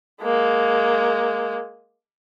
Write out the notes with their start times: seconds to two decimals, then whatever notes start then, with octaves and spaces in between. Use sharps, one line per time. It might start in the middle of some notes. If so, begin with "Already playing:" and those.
0.22 G#3 A#3